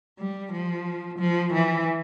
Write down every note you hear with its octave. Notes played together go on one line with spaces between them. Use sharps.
G3
F3
F3
E3